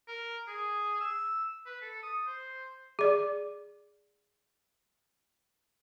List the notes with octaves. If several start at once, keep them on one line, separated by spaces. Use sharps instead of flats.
A#4
G#4
E6
B4
A4
D#6
C5
G#4 D5